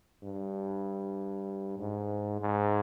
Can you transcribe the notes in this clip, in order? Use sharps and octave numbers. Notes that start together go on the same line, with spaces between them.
G2
G#2
G#2